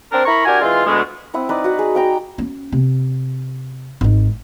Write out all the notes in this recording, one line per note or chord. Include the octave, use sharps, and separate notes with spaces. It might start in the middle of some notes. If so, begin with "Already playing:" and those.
C4 D4 A#4
E4 A#4 A#5 B5 C#6
D4 F#4 G4 A#4 G#5
E3 G#3 C4 F4
D2 B2 G#3
C4 E4 F#5 D#6
D#4 B4 D5
F#4 F#5
G#4
F#5 G5 A#5
C#4
C3
G#1 D#4